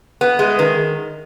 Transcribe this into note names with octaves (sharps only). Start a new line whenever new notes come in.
B3
G#3
D#3